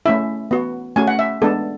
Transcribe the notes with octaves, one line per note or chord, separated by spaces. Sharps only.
A3 C#4 E4 E5
B3 F#4
A3 C#4 F#4 G#5
F#5
E5
G#3 B3 D4 A4